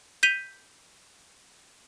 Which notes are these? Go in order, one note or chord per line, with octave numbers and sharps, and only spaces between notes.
G6 B6 D#7 F7 G7